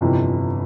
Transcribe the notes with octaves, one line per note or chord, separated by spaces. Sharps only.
G1 F2 C3 E3